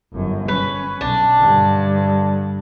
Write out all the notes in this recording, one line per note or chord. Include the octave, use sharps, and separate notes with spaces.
G1 F#2
C#4 B4
B1 D4
G2 D3